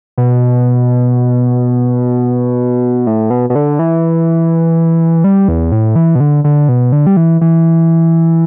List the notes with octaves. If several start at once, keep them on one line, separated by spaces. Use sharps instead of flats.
B2
A2
B2
B2
D3
E3
G3
E2
A2
E3
B2
D3
D3
B2
D3
G3
E3
E3